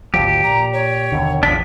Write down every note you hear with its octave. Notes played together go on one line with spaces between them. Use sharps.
G#1 D2 F3 G4
A#2 A#5
C#5
D#2 B2 D3
A1 E2 F3 D4 B6